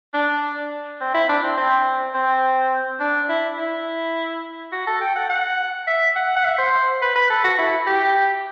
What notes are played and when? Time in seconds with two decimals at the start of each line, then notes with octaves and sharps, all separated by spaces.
0.14 D4
1.01 C4
1.14 E4
1.29 D4
1.43 C4
1.57 C4
2.15 C4
3.00 D4
3.29 E4
3.58 E4
4.73 F#4
4.87 A4
5.01 G5
5.16 F#5
5.30 F#5
5.88 E5
6.16 F#5
6.37 F#5
6.45 E5
6.58 C5
7.02 B4
7.16 B4
7.30 A4
7.44 F#4
7.59 E4
7.87 G4